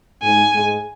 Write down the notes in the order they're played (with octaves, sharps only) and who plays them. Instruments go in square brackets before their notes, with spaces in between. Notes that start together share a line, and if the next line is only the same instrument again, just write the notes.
[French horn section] G#2 G#3 [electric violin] G#5
[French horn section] G#2 G#3